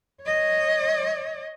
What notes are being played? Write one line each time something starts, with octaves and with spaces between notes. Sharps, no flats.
C#5 D#5